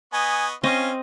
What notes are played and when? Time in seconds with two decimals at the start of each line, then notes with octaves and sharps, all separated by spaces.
0.13 B3 D#5 G#5 C#6
0.64 C4 C#4 F4 C#5 D#5 F5